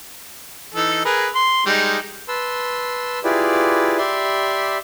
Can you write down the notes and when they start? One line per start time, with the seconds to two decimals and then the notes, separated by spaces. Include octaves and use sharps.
0.74 E3 D#4 A4
1.05 G#4 A#4 B4
1.35 C6
1.66 G3 G#3 D#4
2.28 B4 A5 C6 E6
3.24 E4 F4 G4 G#4 B4 D5
3.98 G4 D5 E5 B5 C6